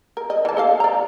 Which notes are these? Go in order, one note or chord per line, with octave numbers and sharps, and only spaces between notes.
A#4
D#5
E3 A5
A4 D#5 F5
D5 A#5